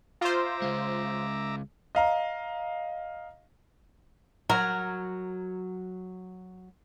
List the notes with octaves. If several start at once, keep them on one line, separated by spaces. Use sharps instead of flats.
F4 C5 E5 A#5 D6
C#2 G#3
D#5 F5 A#5
F#3 F#4 A#4